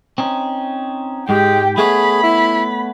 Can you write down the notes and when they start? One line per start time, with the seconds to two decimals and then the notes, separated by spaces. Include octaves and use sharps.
0.18 C4 C#4 D#4
1.29 G#2 G#3 G4 G5
1.78 A3 B3 G#4 C#5 B5
2.23 E4